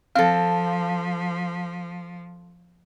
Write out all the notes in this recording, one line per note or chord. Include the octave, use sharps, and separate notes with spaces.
F3 C4 A4 F5